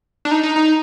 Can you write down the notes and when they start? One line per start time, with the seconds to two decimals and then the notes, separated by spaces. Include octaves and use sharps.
0.25 D4
0.31 D#4
0.43 D#4
0.56 D#4